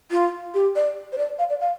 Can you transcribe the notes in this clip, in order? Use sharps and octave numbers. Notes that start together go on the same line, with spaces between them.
F4
G4
D5
C5
D5
F5
D5
F5